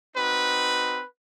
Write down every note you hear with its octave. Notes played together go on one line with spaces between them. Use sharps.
C4 D#4 F#4 B4